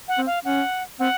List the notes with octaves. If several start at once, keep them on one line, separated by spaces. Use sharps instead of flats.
F#5
C4
F5
C#4 F#5
C4 F#5